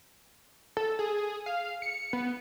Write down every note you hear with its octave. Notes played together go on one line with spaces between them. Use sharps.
A4
G#4
F5
C#7
B3